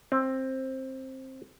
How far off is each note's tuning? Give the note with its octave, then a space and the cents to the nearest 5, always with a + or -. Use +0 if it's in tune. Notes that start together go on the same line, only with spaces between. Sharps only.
C4 +15